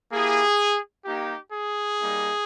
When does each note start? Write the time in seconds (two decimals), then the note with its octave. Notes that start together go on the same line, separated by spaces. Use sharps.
0.11 A#3 E4 G4 G#4
1.05 A#3 D#4 G4
1.52 G#4
1.98 G3 A#3 D#4